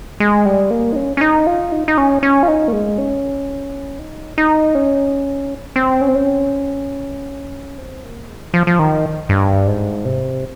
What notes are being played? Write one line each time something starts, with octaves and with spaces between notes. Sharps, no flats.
G#3
G3
A#3
D#4
C#4
C#4
D#4
F4
D#4
D#4
C#4
C#4
F4
D#4
A#3
G#3
C#4
D#4
D#4
C#4
C4
C#4
C4
C#4
C4
A#3
G#3
D#3
F3
F3
D#3
G2
G#2
C3